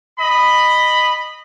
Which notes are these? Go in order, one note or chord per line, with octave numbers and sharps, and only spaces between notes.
D#5 B5